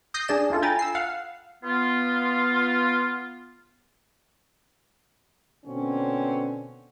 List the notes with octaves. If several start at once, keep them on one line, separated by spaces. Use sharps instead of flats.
D#6 G6 A#6 C7
D4 G#4 D5 E7
D4 E4 F4 A4
G5 G#5 A#5 B5 A6
E6 C7
F5 F#5
B3 F4
B2 D3 C4 C#4